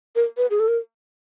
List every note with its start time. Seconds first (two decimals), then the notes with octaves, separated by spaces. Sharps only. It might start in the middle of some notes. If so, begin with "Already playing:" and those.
0.16 A#4
0.37 B4
0.50 G#4
0.60 A4
0.68 A#4